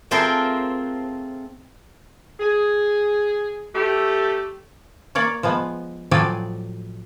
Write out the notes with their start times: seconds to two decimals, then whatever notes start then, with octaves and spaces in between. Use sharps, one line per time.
0.11 A3 C4 F4 G#4 A#4 C5
2.40 G#4
3.75 A3 G4
5.15 A#3 C#5 D5
5.43 F3 G#3 B3
6.11 A2 F3 F#3 D5 G5 G#5